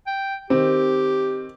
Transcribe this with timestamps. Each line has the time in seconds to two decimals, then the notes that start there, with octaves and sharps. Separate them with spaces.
0.07 G5
0.50 D#3 C4 G4